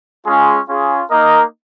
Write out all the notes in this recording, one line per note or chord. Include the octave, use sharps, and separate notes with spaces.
G#3 C#4 F4 G#4
C#4 F4 G#4
A#3 D#4 A#4 D#5